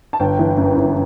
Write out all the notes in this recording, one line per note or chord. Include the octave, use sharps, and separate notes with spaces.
A5
G1 G5
E3
F#2
G1